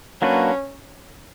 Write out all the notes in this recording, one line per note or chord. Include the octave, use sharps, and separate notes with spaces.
F#3 A#3 C#4 D4 F#4 B4